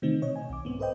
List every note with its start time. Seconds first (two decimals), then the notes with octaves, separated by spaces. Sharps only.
0.02 C3 D#3 E3 A3 C4 D#4
0.22 B2 C#5 D#5
0.36 G#5
0.50 B1 D6
0.65 G#2 B3 C4
0.80 A4 B4 C5 D#5 G5